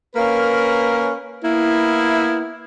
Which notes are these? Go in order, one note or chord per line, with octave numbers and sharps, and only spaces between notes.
A#3 C#4 A#4 B4 F5
A#3 B3 E4